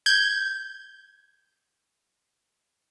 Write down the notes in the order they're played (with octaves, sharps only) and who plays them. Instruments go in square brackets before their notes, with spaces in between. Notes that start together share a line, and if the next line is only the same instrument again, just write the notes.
[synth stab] G6 G#6